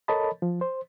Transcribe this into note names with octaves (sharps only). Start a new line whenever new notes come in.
A4 A#4 C#5 D#5 A5 B5
F3
C5